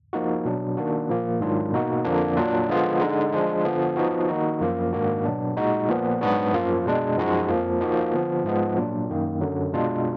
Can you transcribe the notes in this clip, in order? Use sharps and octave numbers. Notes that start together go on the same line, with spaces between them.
F3 A#3 D#4 F#4
B2 F#3 D4
D#3 A#3 D4 F#4
A#2 F3 A#3
G#2 D#3 F#3 D4 F4
B2 A#3 D#4 F#4
F2 D3 F3 A#3 D4
A#2 F#3 D4 F4
D3 F3 G#3 B3 F4
D3 G#3 D#4
F3 G#3 D4 F4
D3 F3 B3
F3 B3 D#4 F#4
D#3 A#3 D#4 F#4
F#2 F3 A#3 F4
G#2 D#3 A#3 D4 F#4
B2 F#3 B3 D4
A#2 G#3 D#4 F#4
A#2 F3 B3
G#2 F#3 B3 D4 F#4
F#2 F3 A#3 F4
B2 G#3 D4
F#2 F3 G#3 D#4 F#4
F2 F3 A#3
F3 A#3 D#4 F#4
D3 F3 B3
G#2 F3 G#3 B3
A#2 F#3 D4 F4
F#2 D#3 A#3
F#2 D3 F#3
B2 G#3 D4 F4